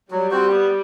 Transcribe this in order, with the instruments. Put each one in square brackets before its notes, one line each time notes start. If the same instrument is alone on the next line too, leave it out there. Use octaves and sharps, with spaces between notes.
[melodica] F#3 [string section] G3
[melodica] C4 F#4 C5
B3